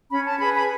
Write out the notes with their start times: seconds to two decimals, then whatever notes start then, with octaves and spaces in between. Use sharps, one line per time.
0.10 C#4 B5
0.25 A5
0.38 G#4 B4 B5
0.53 B5